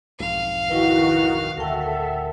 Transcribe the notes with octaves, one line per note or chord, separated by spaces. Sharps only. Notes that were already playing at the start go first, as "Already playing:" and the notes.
B1 F2 G#2 F5
D#3 E4 F#4 A#4 B4
D1 D2 A4 A#4 E5 F#5 G5